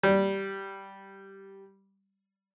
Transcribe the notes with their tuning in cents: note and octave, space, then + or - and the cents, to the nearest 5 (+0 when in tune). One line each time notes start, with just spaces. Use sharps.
G3 -5